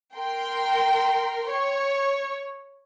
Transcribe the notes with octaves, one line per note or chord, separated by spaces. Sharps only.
A#4 G5 C6
C#5